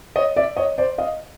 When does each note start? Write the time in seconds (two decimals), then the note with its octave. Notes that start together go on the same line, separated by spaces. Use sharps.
0.16 C#5 D#5
0.36 D5 E5
0.57 C#5 D#5
0.78 C5 D5
0.98 D#5 F5